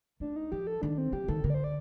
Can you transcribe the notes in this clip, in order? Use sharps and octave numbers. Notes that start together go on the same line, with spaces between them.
A3 D4
D#4
F3 G4
A4
D#3 D4
C4
F3 G4
D#3 A4
D3 A#4
D5
C5
D5